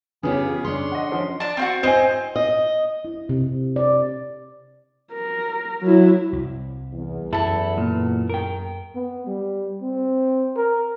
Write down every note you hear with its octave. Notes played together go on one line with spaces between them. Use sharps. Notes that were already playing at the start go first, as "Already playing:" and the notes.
C#3 B3 C#4 F4 G4 G#4
D4 C#5 C6
D#5 F#5
F3 C#4
D4 A5
C4 F4 F#4
C4 C5 D#5 G#5
D#5
E4
C3
D5
A#4
F#3 E4
C2
E2
F#2 E4 A4 A5
A#2
A#4 G5
B3
G3
C4
A#4